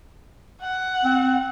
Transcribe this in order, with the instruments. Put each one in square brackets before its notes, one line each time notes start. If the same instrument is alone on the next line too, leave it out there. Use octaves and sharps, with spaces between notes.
[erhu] F#5
[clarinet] C4